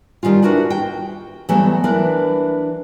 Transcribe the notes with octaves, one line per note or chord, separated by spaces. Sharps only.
D#3 G3 C#4 F4
D4 E4 F#4 A#4 B4
G5
E3 F#3 G3 A3 B3
E3 D4 A#4 B4